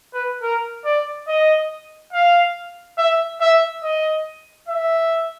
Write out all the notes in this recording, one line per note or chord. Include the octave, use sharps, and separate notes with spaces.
B4
A#4
D5
D#5
F5
E5
E5
D#5
E5